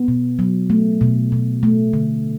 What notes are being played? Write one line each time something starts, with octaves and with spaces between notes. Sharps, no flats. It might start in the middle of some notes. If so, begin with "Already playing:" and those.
Already playing: B3
B2
F#3
A3
B2
B2
A3
D3